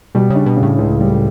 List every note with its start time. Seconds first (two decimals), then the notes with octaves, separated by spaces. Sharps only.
0.15 B2 G3
0.30 C#3
0.35 D4
0.46 B2
0.57 C#3
0.63 A2
0.78 C#2
1.01 G3